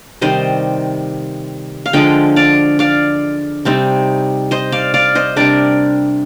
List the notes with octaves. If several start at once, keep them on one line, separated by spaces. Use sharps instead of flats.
C3 D#3 G3 C5 D#5
F5
D3 F3 G#3 D#5 G5
D5 F5
D5 F5
C3 G3 C4 D#4
C5 D#5
D5 F5
D5 F5
C5 D#5
C3 G3 D4 A#4 D5